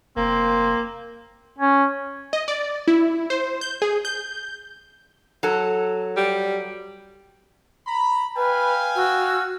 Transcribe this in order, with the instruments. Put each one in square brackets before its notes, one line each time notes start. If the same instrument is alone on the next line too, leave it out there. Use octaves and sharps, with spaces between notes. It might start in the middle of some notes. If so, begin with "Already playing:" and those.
[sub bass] F1 [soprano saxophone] A#3 [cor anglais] C4
[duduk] C#4
[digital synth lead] D#5
D5
E4
C5
G6
G#4
G6
[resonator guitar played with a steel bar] F#3 A4
[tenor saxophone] G3
[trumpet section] A#5 B5
[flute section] B4 [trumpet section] F5 G5 G#5
[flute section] F#4 E6